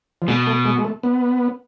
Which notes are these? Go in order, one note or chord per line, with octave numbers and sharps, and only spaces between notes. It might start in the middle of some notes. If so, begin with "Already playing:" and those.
F3
B2 G#3
A3
G#3
G#3
A3
B3